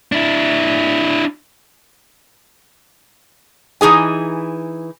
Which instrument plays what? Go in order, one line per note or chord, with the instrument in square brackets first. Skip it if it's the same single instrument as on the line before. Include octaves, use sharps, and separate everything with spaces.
[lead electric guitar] D4 E4
[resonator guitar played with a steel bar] E3 D#4 G#4 G#5